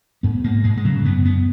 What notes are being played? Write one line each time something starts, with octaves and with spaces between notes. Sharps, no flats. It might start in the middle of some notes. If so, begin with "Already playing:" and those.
G#2 B3
G#2 A#3
G#2 G#3
G#3
C#3 F#3
F#2 B3
F#2 B3